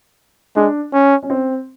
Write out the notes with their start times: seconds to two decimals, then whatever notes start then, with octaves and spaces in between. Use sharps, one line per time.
0.56 G#3 D4
0.93 C#4
1.23 C#4
1.30 C4